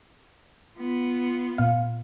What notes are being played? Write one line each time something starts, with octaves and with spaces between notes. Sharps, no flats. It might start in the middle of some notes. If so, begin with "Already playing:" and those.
B3 F4
A#2 F5